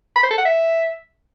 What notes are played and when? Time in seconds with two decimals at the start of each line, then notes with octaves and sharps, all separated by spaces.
0.16 B5
0.23 C5
0.31 A4
0.38 F#5
0.45 E5